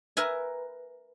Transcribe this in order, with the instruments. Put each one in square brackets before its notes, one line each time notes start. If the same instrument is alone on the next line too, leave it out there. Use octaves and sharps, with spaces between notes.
[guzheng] A#4 B4 E5 G#5